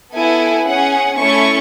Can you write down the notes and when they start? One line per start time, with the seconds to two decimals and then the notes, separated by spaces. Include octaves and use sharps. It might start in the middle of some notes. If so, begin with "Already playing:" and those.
0.15 B3 E4 A4 G#5
0.67 C#4 G#4 F#5
1.19 A3 C#4 E4 A4 C#6